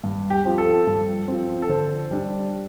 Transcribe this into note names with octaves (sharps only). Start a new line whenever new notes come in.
G2
G4
F3 C4
A4
G2
F3 C4
A4
D3 C5
G3 D4